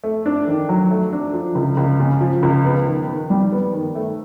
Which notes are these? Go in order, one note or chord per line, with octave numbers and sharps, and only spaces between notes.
A3
D4
D#3
F#3
A3
D4
F3
C#2
C#2
C#3
F3
C#2
B3
D#3
D#3
G3
B3
D#3
A3